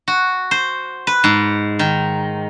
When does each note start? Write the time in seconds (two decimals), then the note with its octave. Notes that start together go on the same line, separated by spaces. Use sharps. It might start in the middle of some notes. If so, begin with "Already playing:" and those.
0.08 F#4
0.51 C5
1.07 B4
1.24 G#2
1.79 D#3